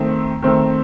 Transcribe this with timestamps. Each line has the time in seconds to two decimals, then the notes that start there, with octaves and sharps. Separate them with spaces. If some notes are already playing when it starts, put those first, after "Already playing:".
Already playing: D#3 A3 C4
0.42 D#3 A3 C4